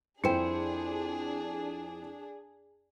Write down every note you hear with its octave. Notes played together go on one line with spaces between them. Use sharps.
F2 D4 E4 G#4 C5 G5 C#7